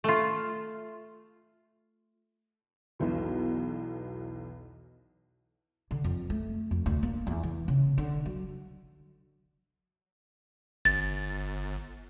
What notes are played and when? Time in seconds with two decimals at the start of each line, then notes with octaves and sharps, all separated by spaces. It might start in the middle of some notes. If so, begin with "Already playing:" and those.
0.04 A3 F4
2.99 B1 E2 B2
5.91 D3
6.04 F2
6.30 A3
6.71 F2
6.86 D2
7.03 A#3
7.27 E2
7.43 E3
7.68 C#3
7.98 D3
8.26 F#3
10.85 G1 A6